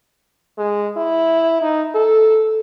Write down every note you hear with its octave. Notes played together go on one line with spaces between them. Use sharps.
G#3
E4
D#4
A4